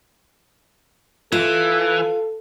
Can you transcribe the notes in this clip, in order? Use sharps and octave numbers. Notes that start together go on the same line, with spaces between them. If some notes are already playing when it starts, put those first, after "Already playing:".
E3 F4 A4